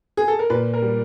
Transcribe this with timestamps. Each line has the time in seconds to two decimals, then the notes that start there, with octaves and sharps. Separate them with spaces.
0.17 G#4
0.28 A4
0.39 A#4
0.50 A#2 B4
0.74 A#4
0.82 G3